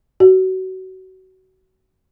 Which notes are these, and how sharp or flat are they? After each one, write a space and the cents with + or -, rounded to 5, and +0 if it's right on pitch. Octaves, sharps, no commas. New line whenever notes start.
F#4 +25